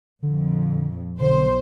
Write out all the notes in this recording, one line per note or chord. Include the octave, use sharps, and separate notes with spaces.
A#1 F2 D3
B1 D3 C5